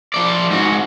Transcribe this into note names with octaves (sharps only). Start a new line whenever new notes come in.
F3 D5
G#2 F#4